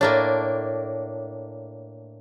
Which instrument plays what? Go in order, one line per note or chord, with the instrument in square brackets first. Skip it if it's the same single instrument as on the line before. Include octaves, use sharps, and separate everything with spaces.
[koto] A2 A#3 D4 [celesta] C#5